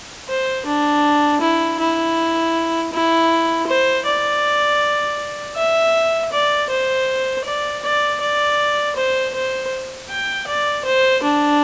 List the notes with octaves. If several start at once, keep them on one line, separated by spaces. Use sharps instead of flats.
C5
D4
E4
E4
E4
C5
D5
E5
D5
C5
D5
D5
D5
C5
C5
G5
D5
C5
D4